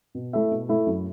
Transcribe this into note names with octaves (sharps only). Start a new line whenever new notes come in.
B2
A3 E4 A4 E5
B2
A3 E4 A4 E5
F#2